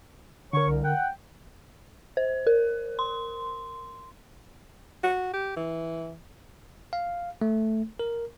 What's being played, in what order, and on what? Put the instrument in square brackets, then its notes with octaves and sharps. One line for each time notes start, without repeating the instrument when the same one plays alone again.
[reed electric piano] D3 A#4 [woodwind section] C#5 C#6
[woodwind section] C2
F#5 G5
[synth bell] C5
A#4
C6
[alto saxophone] F#4
G4
E3
[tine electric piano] F5
A3
A#4